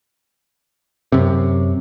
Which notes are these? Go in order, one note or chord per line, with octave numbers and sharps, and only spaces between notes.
F#2 C3